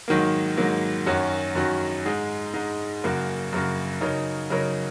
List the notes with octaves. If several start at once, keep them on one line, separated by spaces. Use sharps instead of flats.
G#2 D#3 F#3 A#3
G#2 D#3 F#3 A#3
F#2 D#3 F#3 C#4 F#4
F#2 D#3 F#3 C#4 F#4
G#2 G#3 D#4
G#2 G#3 D#4
F#2 C#3 A#3 F#4
F#2 C#3 A#3 F#4
C#3 F#3 D#4 A#4 C#5
C#3 F#3 D#4 A#4 C#5